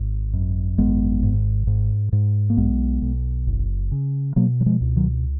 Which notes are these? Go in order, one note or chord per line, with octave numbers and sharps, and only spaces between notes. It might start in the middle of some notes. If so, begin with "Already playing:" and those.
Already playing: G#1 G#2
F#2
G#1 G#3 B3
G#2
G#2
G#2
A#3
B1 G#3 B3
B1
F#1
C#3
B2 F#3 A#3
F#3
F3 G#3
C#2
D#3 F#3